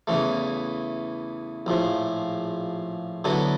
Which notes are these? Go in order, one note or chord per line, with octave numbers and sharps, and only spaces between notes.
E2 C#3 E3 A3
A#1 A2 F3
D3 F#3 B3 E4 A4